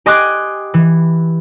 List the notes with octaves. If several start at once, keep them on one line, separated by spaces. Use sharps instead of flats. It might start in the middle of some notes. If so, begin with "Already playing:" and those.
G4 D#5 G#5 C6 D6 F#6
E3